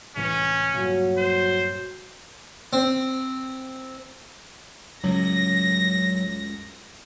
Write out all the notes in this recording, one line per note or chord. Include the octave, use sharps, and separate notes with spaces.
C2 A2 E3 C#4
G2 A#2 F#3
C5
C4
C#2 F#2 A2 F#3 A#6